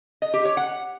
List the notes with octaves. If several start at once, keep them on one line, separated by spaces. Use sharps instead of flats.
D#5
G4
C#5
F#5